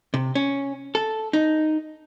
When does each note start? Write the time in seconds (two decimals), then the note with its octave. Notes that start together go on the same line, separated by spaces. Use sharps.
0.14 C3
0.35 C#4
0.95 A4
1.33 D#4